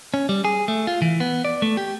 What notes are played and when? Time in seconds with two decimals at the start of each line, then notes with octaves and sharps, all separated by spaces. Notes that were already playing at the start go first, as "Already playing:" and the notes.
0.14 C#4
0.29 G3
0.45 G#4
0.68 A3
0.87 F4
1.02 E3
1.20 B3
1.45 D5
1.62 A3
1.77 G4